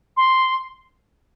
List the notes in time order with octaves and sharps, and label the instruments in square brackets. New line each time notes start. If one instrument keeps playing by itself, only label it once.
[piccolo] C6